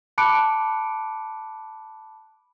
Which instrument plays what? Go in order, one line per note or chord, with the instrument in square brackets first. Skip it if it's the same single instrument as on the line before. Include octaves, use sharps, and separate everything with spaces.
[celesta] A5 B5 D6 F#6 C#7 D7